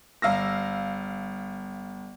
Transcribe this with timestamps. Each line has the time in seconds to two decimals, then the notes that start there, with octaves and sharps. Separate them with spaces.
0.22 G1 F5 E6 A#6